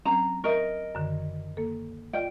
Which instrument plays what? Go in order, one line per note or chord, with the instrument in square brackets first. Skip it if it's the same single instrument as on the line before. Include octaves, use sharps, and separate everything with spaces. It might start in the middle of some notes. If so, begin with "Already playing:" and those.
[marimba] F#3 C4 C#4 [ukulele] A#5
[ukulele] A#4 D#5 [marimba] E5 A#5 C#6
[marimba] F#2 D3 D#3
A#3 A4
[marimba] F4 D5 D#5 [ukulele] G5